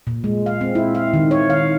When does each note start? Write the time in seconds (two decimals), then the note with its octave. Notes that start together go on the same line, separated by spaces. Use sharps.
0.07 A#2
0.24 G#3
0.46 F5
0.61 C4
0.75 E4
0.95 F5
1.14 D#3
1.31 C#5
1.50 F5